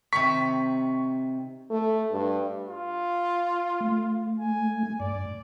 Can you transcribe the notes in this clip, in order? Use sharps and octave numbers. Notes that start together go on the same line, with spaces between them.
C3 D#3 C#6 B6
A3
G2
F4
A3
G#5
G2 D5